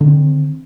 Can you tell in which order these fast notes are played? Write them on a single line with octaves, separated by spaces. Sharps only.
D3 D#3 C4